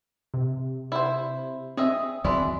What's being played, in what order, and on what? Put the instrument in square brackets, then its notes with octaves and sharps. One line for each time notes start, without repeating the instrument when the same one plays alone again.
[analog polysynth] C3
[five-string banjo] E4 C5
[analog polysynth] C4 [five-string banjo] G#4 D#5 E5
[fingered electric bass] E2 D#3 F#3 [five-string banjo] G#3 D4 E4